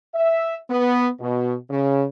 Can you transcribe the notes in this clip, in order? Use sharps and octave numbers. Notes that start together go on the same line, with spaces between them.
E5
B3
B2
C#3